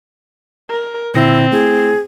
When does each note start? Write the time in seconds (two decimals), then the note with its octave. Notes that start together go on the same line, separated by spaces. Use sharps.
0.70 A#4
1.14 A#2 D3 C4 E4 A#6
1.52 A3 E4 G#4